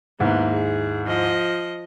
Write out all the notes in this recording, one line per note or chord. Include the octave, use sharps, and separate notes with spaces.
D#2 G#2 A#3 B3 E4
G#4
F3 D#5